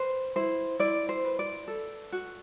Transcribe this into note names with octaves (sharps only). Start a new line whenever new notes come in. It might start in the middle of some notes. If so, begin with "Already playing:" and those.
Already playing: B4 C5
E4 C5
E4 D5
C5
B4
D5
A4
F#4